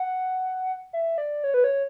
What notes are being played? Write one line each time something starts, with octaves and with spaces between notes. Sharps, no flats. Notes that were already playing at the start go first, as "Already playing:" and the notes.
Already playing: F#5
E5
D5
C#5
B4
C#5